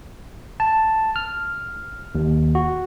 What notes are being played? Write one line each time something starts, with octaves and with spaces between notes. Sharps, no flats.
A5
F6
D#2
F#4